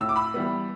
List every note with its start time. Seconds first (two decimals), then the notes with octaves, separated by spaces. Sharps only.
0.01 A2 E6
0.09 D6
0.16 B5 E6
0.34 E3 G3 B3